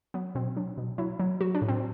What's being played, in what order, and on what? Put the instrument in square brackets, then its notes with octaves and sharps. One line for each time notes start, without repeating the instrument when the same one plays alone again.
[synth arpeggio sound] F#3 B3
B2 C4
F#3 D4
B2
F#3 E4
F#3
F#3 F#4
D4
A2
C4